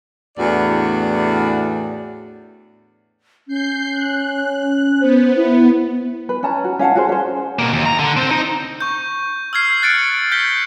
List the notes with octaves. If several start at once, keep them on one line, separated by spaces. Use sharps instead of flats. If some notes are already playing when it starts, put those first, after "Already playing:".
E2 A2 D4 F#4 D5
C#4 G6 C7
F#6
B3 C5
E4
B4
C#4 A5 A#5
F#4
C#4 F5 F#5 A5
F#4 G#4 C5
C#4 C5
B2 A#3
D#2
A#5
D3
C4 C5
D#4
C#6 G6
E6 F6 G#6 C7
F#6 A6 C#7 D7
G6 B6 G7